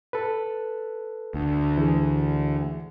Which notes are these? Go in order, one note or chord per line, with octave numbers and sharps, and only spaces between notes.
A4 B4
D2
E3 G#4